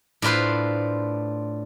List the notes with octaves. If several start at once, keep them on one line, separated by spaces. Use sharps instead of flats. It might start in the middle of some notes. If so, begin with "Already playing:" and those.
A2 D4 F4 B4 C5